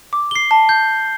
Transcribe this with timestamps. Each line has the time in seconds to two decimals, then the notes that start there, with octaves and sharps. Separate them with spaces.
0.13 D6
0.31 C7 G7
0.51 A5
0.69 G6